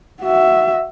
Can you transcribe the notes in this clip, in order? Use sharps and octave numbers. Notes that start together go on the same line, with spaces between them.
F#4 E5